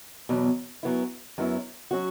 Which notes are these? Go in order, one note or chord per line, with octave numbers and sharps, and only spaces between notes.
E2 B2 F#3
F#2 F#3 B3 E4
F#2 F#3 B3 E4
F#3 C#4 F#4